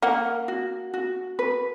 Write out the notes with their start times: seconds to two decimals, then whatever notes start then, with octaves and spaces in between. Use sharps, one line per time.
0.02 A#3 F#5
0.48 F#4
0.94 F#4
1.39 B4